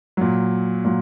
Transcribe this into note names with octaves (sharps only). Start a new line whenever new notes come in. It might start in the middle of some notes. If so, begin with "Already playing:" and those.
A#2 F#3
A#2 F#3